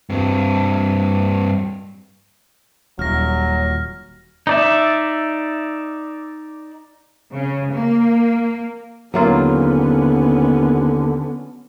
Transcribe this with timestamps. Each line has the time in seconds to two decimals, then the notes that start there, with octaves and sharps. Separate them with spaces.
0.10 G2 C4
2.99 D#1 F#3 F6 A#6
4.47 D#4 D5 E5
7.32 C#3
7.73 A#3
9.14 D#2 D3 F#3 A#3 B3 C#4 F4